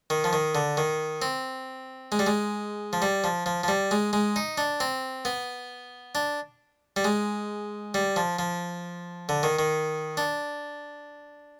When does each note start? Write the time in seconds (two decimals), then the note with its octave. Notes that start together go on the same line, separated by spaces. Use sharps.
0.10 D#3
0.24 F3
0.33 D#3
0.55 D3
0.77 D#3
1.22 C4
2.12 G#3
2.19 G3
2.27 G#3
2.93 F3
3.02 G3
3.24 F3
3.46 F3
3.63 F3
3.68 G3
3.91 G#3
4.13 G#3
4.36 D#4
4.58 D4
4.80 C4
5.25 B3
6.15 D4
6.96 G3
7.04 G#3
7.94 G3
8.16 F3
8.39 F3
9.29 D3
9.43 D#3
9.59 D#3
10.17 D4